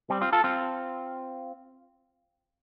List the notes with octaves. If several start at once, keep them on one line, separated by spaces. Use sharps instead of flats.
G3 C4
C4 F4
F4 A4
C4 F4